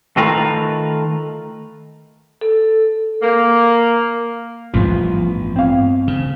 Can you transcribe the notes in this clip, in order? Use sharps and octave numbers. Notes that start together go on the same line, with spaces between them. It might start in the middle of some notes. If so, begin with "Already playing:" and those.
D#3 A3 F4 A#4 B4
A4
A#3
A1 G2 F3 B3
C4 F5
C#3